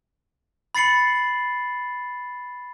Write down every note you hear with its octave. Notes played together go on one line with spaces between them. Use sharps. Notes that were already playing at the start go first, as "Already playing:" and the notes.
B5 A6 C7 C#7 F#7